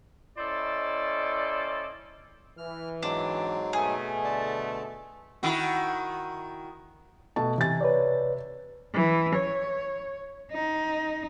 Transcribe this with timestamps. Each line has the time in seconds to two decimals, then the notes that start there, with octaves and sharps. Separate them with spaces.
0.38 C#4 E4 A4 C5 D5 D#5
2.58 E3 F6
3.03 G#2 F#3 C4 D4
3.73 B2 A3 G#4
4.24 D3 D5 A5
5.43 D#3 E4 F#4
7.36 B2 A3 A5
7.58 C3 E3 G#5 A6
7.81 B4 C#5 D5
8.94 E3
9.36 C#5
10.52 D#4